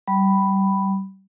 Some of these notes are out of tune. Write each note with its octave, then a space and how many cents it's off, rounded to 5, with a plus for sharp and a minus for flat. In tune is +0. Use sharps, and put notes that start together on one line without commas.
G3 -25 B5 +5